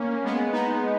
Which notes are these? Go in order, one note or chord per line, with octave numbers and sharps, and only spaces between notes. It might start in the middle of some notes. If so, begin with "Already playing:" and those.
Already playing: A#3 C#4
G#3 B3
B3 D#4